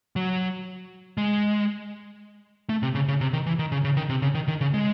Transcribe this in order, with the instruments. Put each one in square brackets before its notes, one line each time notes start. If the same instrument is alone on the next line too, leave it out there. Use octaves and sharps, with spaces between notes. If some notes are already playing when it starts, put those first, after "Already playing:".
[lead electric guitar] F#3
G#3
A3
C3
C#3
C#3
C3
D#3
E3
D#3
C#3
C#3
D#3
C3
C#3
D#3
D#3
C#3
G#3